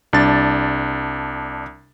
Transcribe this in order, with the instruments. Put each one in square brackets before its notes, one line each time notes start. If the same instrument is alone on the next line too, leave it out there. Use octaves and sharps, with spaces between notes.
[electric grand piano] C2 D4 A6